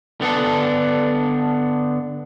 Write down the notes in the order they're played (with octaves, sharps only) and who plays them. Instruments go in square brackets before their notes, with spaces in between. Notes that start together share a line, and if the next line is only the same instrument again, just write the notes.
[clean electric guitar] D3 B3 D4 A4